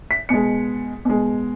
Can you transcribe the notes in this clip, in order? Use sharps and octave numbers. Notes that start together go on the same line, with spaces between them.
B6
B2 G#3 C#7
B2 G#3